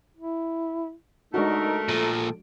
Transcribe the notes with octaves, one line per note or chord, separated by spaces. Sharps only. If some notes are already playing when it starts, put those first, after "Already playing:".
E4
G#3 A3 D4 D#4 F#4 A#4
A#2 F3 A4